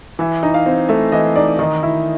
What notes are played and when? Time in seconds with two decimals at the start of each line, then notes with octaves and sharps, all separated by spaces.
0.19 E3 E5
0.43 D#4
0.54 F5
0.66 C4
0.89 A3 E5
1.12 E3 D#5
1.35 D#4 D5
1.59 D#3 D#5
1.83 E4